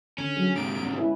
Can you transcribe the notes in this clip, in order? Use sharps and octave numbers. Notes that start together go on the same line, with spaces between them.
D3 C#4
F#3 G#4
G#2 C3 D7
G#3 B3 C#4
E4 B4